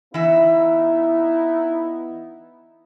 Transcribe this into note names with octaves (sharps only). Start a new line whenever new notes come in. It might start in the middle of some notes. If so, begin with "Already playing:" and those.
E3 B3 D#4 E4 E5